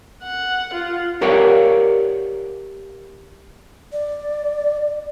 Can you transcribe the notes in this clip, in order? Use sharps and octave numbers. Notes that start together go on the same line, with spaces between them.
F#5
F4
G4 A#4 C#5 D5 F5 F#5
D5